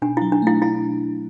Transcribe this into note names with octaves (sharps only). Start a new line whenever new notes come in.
B2 D4
F#3 E4
D4
A3 E4
D4 E4